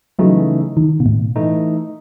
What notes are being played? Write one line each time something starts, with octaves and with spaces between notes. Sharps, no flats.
C#3 E3 F#3 A3 D#4
D#3
B2
A2
E3 A3 D#4